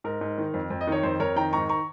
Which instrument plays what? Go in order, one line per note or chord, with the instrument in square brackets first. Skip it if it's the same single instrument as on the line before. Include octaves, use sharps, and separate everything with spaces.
[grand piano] G#2 A#4
G#2
D#3
F2
F2
D#5
D#3 C#5
F2 C5
F2 A#4 C#5
D#3 G5 A#5
G#2 A#5 C#6
A#5 C#6